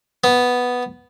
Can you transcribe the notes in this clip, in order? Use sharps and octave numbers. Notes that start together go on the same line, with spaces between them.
B3